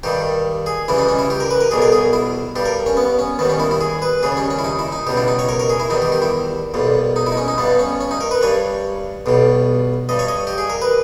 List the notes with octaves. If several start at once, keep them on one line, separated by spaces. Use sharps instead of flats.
G2 D#3 G3 G4
G#4
C#2 C#3 E3 G3 E4
D#4
C#4
E4
G4
A#4
B4
A#4
B1 B2 G3 G#4
A#4
G#4
E4
G2 G3 G4
A#4
C#4
B3
C#4
D#2 D#3 G3 B3
C#4
E4
E4
G#4
B4
D#2 C#3 G3 G#4
C#4
C#4
E4
D#4
E4
D#4
C#2 B2 G3 G4
E4
D#4
C#5
A#4
A#4
G#4
E4
E2 D#3 G3 D#4
G4
G4
E4
B1 A#2 G3
D#4
E4
D#4
C#4
D#4
G2 G3 B3
C#4
C#4
D#4
A#4
B4
G2 G3 C#5
B1 B2 G3
G2 G3 D#5
C#5
D#5
G4
G#4
A#4
B4